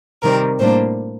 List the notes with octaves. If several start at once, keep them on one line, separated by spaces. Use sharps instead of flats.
C3 D#3 G3 C4 A#4
A2 G3 A#3 D4 C5